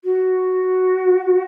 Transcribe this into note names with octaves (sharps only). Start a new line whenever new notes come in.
F#4